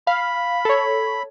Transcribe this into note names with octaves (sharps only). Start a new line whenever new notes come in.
F5 B5
A4 C#5